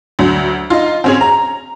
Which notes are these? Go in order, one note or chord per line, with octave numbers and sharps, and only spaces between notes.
D2 F#3
D#4 F4
C4 C#4 G#4
A#5